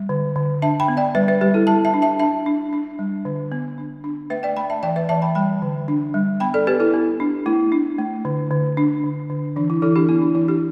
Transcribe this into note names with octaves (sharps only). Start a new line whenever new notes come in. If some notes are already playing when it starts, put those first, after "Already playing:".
Already playing: G3
D3
D3
D4 E5 A5
G5 B5
B3
D5 G5
G3 B4 E5
B4 E5
G3 G4 B4
E4 A4
G3 E5 A5
E5 A5
D4
E5 A5
D4 E5 A5
D4
D4
G3
D3
B3
D4
D4
A3 B4 E5
D5 G5
A3 G5 B5
E5 A5
E3 D5 G5
B4 E5
E3 E5 A5
G5 B5
G3 G5 B5
D3
D4
G3
B3 G5 B5
A4 D5
B3 G4 B4
E4 A4
B3
D4
A3 E4
D4
A3
D3
D3
D4
D3
D3
E3 D4
E4
E3 E4 A4
D4 G4
B3 E4
D4
E3 E4
D4 G4